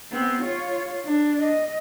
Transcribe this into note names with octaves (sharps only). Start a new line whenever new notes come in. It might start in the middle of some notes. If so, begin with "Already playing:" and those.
B3 C4
F4 C#5
D4
D#5